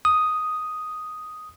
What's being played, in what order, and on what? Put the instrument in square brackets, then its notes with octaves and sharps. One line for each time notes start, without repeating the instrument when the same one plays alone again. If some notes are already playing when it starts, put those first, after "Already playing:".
[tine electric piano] D#6